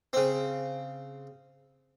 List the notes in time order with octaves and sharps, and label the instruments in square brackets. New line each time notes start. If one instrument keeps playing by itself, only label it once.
[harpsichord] C#3 C4